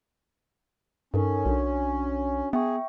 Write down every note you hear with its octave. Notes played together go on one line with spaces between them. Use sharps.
G2 C#4 D#4 A4 A#4
B1 D4 F#4
B3 G#4 E5 G5 C#6